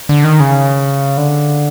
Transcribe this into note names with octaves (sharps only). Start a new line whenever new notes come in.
D3
D#3
C#3
D3